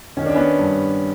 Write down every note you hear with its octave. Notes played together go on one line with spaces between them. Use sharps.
D#3 C#4
D4
B3 C#4
G2